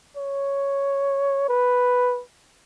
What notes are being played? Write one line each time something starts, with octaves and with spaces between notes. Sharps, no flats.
C#5
B4